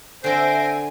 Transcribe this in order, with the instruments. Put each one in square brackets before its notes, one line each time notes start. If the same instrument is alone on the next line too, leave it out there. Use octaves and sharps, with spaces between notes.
[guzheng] D3 C4 [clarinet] C5 [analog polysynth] E5 A#6 D7 [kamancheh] G#5